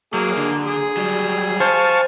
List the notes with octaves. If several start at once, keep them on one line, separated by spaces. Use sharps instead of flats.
F#3 A#3 G#4
D3
G#4
F#3 G3
C5 F5 G#5 A5 C#6